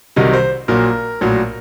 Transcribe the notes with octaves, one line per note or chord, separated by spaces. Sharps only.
C2 C3 D#3 F#3 D#4
C5
A#1 A#2 F#3 A#4
A#1 A2 F#3